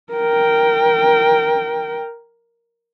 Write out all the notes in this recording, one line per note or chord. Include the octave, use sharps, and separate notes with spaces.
A#4 G5